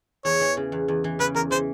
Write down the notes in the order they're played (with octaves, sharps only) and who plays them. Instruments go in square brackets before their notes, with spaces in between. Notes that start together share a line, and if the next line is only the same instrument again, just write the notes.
[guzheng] E2 [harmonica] C#5
[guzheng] E3
C#3
E2
E2
E3
[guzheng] C#3 [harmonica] B4
[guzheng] E2 [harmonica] A#4
[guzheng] E3 [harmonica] C5